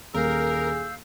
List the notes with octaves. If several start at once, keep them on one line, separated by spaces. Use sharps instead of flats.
D#1 G#4 A#4 F5 E6 G6